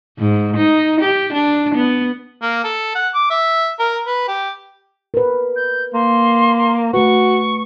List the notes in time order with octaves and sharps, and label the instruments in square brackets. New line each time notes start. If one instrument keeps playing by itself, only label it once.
[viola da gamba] G#2
D#4
G4
D4
B3
[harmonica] A#3
A4
F#5
D6
E5
A#4
B4
G4
[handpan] A#4 B4
[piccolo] G6
[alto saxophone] A#3 [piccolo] C6
[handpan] A3 B4 [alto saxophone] F#4 [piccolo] C#6